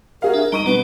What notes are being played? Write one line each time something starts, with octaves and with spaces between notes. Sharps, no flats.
F#4 G#4 A#4 F5
D4 E5
G3 D#4 D#5 A#5 C#6 D#7
B2 G3 D4 B4